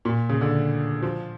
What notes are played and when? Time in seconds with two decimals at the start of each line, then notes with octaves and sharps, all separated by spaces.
0.05 A#2
0.29 C#3
0.41 D3
1.02 F3